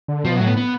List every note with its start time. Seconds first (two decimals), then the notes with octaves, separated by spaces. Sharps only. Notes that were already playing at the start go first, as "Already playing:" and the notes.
0.08 D3
0.25 B2 F3
0.36 A2 F#3
0.46 B3
0.57 B3